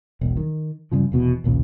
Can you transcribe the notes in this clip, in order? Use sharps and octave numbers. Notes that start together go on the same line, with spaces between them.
E1 B1
D#3
G2 C#3 F3
F1 E2 B2
A#1 D#2 A#2 C#3